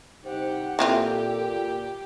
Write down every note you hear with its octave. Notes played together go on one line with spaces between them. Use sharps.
C2 D#4 G4 C5 F#5
A#2 E3 C4 F4 G4 A4